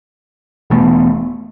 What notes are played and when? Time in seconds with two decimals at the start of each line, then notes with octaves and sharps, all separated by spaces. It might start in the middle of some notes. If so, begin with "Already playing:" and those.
0.70 E1 E2 B2 A3